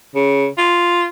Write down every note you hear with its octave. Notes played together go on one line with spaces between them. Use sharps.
C#3
F4